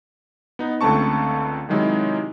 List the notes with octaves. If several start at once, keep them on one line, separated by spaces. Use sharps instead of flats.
B3 D#4
C#2 D3 A3 C4 A5 C#6
C3 D#3 F#3 G#3 D#4 E4